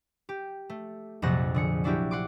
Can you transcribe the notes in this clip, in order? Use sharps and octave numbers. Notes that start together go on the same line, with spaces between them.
G4
A3
A#1 F2 C3 F#3 F#5 A#6
D3 G#4 C#7
F#3 D4 E4 F#4 G4
F#5 C6 D6